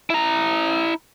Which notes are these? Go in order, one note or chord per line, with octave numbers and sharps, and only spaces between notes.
E4 A#5